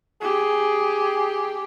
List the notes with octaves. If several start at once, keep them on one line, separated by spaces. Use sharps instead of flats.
G4 G#4